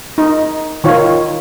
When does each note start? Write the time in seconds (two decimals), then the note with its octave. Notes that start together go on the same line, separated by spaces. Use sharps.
0.18 D#4
0.84 D#3 F4 C#5